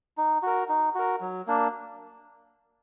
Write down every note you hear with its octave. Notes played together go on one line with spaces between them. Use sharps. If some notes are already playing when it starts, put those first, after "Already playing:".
D#4
F#4 A#4
D#4
F#4 A#4
F#3
A#3 D4